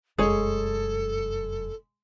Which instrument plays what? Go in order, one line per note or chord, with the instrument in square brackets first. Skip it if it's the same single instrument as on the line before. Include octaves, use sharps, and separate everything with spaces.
[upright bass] F1 F#2 [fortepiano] G#3 [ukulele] G#4 C#5 [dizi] A4